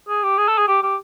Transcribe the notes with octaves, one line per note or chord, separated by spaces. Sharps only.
G#4
G4
G#4
A4
G#4
G4
G4